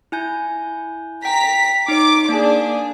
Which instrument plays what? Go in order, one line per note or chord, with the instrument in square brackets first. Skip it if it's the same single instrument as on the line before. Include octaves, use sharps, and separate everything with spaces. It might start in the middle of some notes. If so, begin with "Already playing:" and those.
[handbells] E4 G#5 G6
[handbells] G5 [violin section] A#5 B6
[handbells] D#4 C#5 [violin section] D6
[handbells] A#3 [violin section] D4 G#4